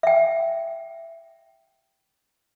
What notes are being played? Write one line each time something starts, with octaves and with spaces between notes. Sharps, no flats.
E5 G5